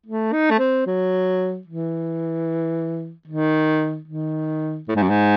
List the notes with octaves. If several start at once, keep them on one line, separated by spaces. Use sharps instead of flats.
A3
D#4
A3
C4
F#3
E3
D#3
D#3
A2
G#2
F#2
G#2